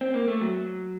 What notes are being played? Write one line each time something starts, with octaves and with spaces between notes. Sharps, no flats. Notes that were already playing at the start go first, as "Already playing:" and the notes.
C4
A#3
A3
F#3